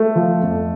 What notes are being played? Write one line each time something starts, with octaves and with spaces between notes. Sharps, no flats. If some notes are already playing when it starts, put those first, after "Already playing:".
Already playing: A3
F3
F2